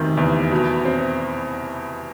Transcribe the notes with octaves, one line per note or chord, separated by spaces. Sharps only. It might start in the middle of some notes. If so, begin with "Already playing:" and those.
Already playing: F1 C3 D#3
E2
B2
C4